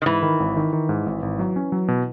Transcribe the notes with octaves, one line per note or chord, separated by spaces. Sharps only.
D#3
G#2 E3
D#3
G#1
D#3
D#3
G#2
G#1
G#1
F#3
C#4
F#3
B2